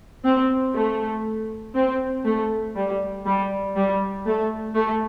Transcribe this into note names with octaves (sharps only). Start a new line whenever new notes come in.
C4
A3
C4
A3
G3
G3
G3
A3
A3